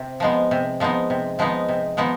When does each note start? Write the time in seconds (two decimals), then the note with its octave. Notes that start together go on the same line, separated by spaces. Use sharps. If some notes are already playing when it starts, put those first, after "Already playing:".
Already playing: C3
0.20 F3 G#3 B3 D#4
0.51 C3
0.80 F3 G#3 B3 D#4
1.10 C3
1.39 F3 G#3 B3 D#4
1.68 C3
1.97 F3 G#3 B3 D#4